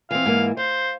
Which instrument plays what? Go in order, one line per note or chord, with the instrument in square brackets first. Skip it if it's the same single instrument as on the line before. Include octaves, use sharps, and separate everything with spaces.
[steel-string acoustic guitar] E3 C4 [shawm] F5
[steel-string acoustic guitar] G#2 E3 A#3
[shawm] C5 [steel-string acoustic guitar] F5